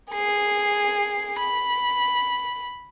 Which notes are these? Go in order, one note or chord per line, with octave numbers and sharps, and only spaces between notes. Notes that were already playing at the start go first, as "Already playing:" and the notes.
G#4 C7
B5